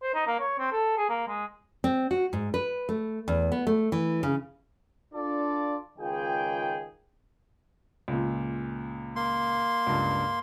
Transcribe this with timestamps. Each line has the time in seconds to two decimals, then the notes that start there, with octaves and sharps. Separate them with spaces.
0.02 C5
0.14 D#4
0.27 A#3
0.40 C#5
0.59 C4
0.72 A4
0.97 G#4
1.09 A#3
1.28 G#3
1.84 C4
2.11 F#4
2.33 G#2
2.54 B4
2.89 A3
3.28 E2
3.52 B3
3.67 A3
3.92 E3
4.23 C#3
5.14 D4 F4 A4 D5
5.99 C#2 D#3 F4 G#4 G5
8.08 C#2 A#2
9.16 A#3 C6
9.87 C#2 G2